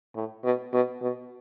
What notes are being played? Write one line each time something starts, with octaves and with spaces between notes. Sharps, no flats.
A2
B2
B2
B2